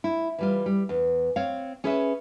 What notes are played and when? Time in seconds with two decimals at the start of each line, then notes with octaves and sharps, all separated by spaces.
0.04 E4
0.39 E3 G3 F4
0.66 G3
0.89 E2
1.36 C4 C#5 F5
1.84 C#4 G#4 B4 C#5 D#5 E5